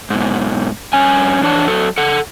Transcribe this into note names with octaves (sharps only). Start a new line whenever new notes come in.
G#2 B2
G2 C#4 G#5
F2 E3 D4 C#5 A5
F#3 A4
A4 F#5